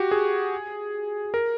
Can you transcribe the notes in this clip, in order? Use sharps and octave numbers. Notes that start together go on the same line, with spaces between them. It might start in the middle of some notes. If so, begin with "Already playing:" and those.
Already playing: F#4 G4
G#4
A#4